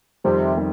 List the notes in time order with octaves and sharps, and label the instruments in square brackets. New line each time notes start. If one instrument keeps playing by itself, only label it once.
[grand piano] F2 D#3 G3 [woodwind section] C3
[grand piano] D#3 G3